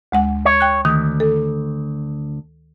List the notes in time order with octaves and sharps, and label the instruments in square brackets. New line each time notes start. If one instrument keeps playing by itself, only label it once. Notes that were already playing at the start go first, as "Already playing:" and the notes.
[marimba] D2 G#3 F#5
[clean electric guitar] C#5
[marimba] G5 F#6
[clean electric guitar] D2 [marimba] D#3 D#6
[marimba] A4